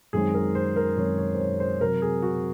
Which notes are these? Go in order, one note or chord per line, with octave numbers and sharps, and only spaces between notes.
F#2 D#3 G#3 C4 G#4
A#4
C5
A#4
F#2 D#3 G#3 C4 C#5
C#5
C5
C#5
C5
C3 F#3 C4 A#4
G#4
F#4